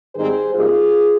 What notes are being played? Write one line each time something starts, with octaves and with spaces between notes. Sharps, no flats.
G#2 D#3 G3 C4 D#4 G#4 C5
C3 G3 A#3 D#4 F4 G#4